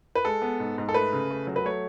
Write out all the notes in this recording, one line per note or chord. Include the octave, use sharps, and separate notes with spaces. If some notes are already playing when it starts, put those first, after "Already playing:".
B4
G#3 A4
B3
G#2
G#2
A4
A3 B4
C#3
A3
F#3
B4
A3 C#5